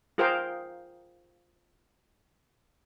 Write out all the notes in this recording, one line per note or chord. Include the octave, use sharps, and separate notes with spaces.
F4 G#4 A#4 C5 F5 G5